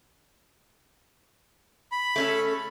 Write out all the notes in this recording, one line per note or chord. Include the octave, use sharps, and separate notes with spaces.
B5
A3 C#4 A4